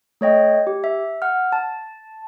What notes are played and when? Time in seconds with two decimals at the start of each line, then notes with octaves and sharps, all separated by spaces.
0.21 A3 C#5 D#5 G5
0.67 G4
0.84 E5
1.22 F#5 F6
1.52 A5